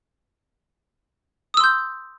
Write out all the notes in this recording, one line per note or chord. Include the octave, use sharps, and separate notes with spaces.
C6 D#6 E6 G6